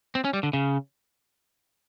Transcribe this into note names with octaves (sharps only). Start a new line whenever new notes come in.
C4
C#4
G3
D3
C#3